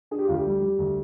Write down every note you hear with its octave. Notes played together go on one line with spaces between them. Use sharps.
D4 G#4
G4
D2 F4
G4
G3
G3
D2